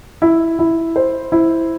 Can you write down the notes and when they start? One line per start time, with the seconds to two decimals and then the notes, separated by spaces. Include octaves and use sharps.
0.22 E4
0.59 E4
0.96 C5
1.32 E4